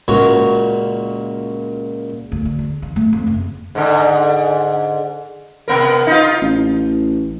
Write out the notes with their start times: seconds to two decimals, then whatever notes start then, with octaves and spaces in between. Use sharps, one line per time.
0.08 C#2 A#2 F#4 C#5
2.32 D2
2.45 D3
2.59 E2
2.82 D#3
2.96 A3
3.13 F2
3.27 F#1
3.75 G#2 D3
5.68 C3 B3 A#4
6.07 D#4 F4
6.41 A1